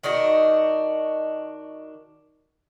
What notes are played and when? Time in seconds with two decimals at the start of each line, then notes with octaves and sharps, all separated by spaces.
0.03 D#3 D4 D#4 F#4